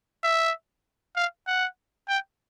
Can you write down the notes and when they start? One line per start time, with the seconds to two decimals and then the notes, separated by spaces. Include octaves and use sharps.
0.23 E5
1.16 F5
1.47 F#5
2.09 G5